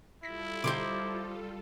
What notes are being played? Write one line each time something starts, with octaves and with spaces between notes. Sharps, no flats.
G3 E4 F4 A4 A#6 B6
B2 D3 D#4 G4 C5 D6